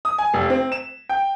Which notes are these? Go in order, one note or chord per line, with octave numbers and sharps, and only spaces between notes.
D#6
G#5
F1
C4
E7
G5